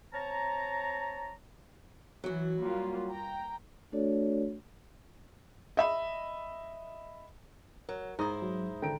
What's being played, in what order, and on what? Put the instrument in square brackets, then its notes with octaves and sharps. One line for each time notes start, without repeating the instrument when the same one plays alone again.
[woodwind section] C4 C#5 A5 A#5
[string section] E3 [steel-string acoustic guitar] F#3 F#4
[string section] G3 A#3 F4
G5 A#5
[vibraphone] A3 D4 F#4 A4 C#5 D5
[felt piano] D#5 E5 B5
[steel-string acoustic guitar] F#3 [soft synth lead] A#4
[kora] G#2 [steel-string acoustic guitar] E4 C5 [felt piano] A#5 D#6
[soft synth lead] F#3
[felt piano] D3 A#5 D7 [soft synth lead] G5